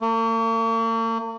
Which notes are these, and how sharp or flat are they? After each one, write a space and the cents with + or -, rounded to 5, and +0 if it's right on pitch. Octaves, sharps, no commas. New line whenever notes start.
A#3 -45